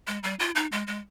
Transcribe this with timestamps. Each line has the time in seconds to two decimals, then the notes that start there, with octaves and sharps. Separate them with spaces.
0.07 G#3
0.23 G3
0.39 F4
0.55 D#4
0.72 G#3
0.87 G#3